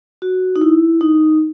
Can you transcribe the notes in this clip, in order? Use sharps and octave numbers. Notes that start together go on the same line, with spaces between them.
F#4
D#4
E4
D#4